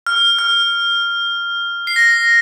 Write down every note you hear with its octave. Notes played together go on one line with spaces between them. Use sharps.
F6
F6
C7
A#6